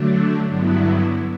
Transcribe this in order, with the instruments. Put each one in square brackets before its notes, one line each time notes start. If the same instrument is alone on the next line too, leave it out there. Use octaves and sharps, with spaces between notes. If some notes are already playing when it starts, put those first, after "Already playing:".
Already playing: [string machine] D3 F#3 A3 D4
G2 D3 F#3 B3 E4